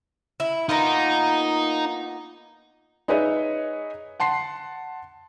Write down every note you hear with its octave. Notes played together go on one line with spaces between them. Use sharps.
E4
A#3 B3 D#4 F4
D#4 G#4 B4 C#5 D#5 E5
F#5 A5 C6 C7